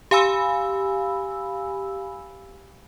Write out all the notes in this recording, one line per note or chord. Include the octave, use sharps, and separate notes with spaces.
G4 F5 G#5 B5 E6